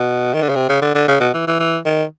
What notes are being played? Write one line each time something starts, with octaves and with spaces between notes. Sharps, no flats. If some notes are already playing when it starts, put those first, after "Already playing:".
Already playing: B2
D#3
D3
C#3
C3
C#3
D3
D3
C#3
B2
E3
E3
E3
D#3